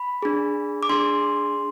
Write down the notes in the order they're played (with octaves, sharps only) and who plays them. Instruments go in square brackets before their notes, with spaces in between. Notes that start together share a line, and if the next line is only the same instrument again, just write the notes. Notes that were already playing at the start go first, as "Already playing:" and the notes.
Already playing: [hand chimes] B5
D4 G#4
D6
D4 G#4 C6